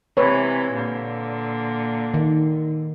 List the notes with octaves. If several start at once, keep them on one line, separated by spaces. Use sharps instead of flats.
C3 E3 G#3 B4 C#5
A#2 D3
D#3